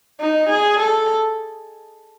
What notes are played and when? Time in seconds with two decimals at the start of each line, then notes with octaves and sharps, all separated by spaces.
0.20 D#4
0.50 G#4
0.80 A4